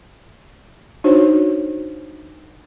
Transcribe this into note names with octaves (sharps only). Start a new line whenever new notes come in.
D4 D#4 F#4 C5 C#5